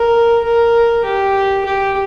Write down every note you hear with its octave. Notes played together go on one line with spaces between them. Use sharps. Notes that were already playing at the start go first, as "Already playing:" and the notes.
Already playing: A#4
A#4
G4
G4